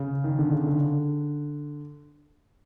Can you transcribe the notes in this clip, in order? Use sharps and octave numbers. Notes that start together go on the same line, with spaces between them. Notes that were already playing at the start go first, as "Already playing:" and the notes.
Already playing: C#3
D#3
D3
C#3
D3